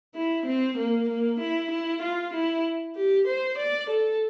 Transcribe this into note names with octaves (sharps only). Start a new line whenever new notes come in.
E4
C4
A#3
A#3
E4
E4
F4
E4
G4
C5
D5
A4